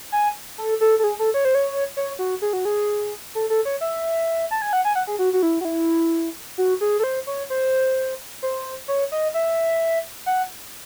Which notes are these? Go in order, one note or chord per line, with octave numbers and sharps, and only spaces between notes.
G#5
A4
A4
A4
G#4
A4
C#5
C5
C#5
C#5
F#4
G#4
F#4
G#4
A4
A4
C#5
E5
A5
G#5
F#5
G#5
F#5
G#4
F#4
F#4
E4
F#4
E4
F#4
G#4
A4
C5
C#5
C5
C5
C#5
D#5
E5
F#5